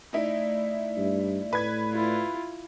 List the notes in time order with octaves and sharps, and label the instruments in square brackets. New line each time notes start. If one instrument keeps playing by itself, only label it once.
[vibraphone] A3 D5 [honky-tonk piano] D#4 E4
[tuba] G2
[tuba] A2 [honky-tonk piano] B4 G#6
[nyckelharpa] E4 F4